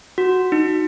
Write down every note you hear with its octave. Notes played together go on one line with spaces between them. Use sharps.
F#4
D#4